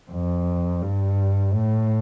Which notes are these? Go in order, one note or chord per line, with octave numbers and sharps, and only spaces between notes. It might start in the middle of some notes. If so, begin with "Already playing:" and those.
F2
G2
A2